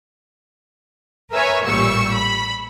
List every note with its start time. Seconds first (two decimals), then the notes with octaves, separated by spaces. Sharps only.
1.32 A#4 B4 C#5 E5 G#5
1.66 A1 A#2 G3 C#6 E6
2.16 B5